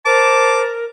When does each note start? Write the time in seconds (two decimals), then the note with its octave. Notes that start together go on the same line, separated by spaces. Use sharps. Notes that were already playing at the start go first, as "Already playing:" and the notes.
0.06 A#4 C5 A5 D6